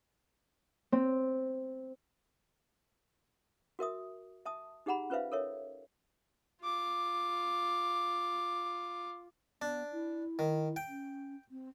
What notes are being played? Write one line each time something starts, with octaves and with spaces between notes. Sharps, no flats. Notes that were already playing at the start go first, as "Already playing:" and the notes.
C4
F#4 A#4 E5 D#6
E5 A5 D#6
D#4 G4 G#4 F#5 A#5 B5
C#4 F4 B4 C5 E5 F5
A4 A#4 C#5 E5
F4 D6
B3 D4
E4
D#3
G5
C#4
C4